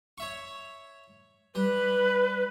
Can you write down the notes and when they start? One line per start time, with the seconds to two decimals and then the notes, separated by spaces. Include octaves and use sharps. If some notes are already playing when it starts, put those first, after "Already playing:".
0.18 C#5 E5 C#6
1.55 G3 B4